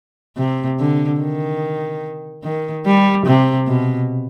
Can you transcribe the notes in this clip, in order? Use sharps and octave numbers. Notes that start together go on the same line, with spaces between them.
C3
D3
D#3
D#3
G3
C3
B2